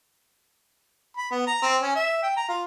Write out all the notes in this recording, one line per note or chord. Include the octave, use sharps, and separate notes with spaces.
B5
B3
A#5
C4
C#4
E5
G5
A#5
F4